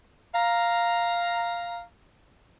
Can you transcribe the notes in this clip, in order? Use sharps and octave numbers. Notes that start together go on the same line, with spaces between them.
F5 A#5